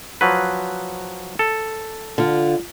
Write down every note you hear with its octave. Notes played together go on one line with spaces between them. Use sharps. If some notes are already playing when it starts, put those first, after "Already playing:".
F3 F#3 B4
A4
D3 F4